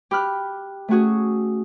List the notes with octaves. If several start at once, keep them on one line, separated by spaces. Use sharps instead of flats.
G4 B5 F6 F#6
A3 C#4 F#4 G#4